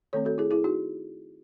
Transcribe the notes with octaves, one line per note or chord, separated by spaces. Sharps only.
D#3 A3 C4 A4 C#5
F#4 A4
E4 G#4
E4 G#4
D#4 F#4